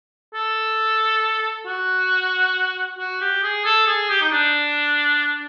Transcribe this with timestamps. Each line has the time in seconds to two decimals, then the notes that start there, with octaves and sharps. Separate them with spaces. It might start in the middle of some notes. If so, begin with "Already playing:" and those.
0.34 A4
1.66 F#4
2.99 F#4
3.21 G4
3.43 G#4
3.65 A4
3.87 G#4
4.10 G4
4.22 D#4
4.32 D4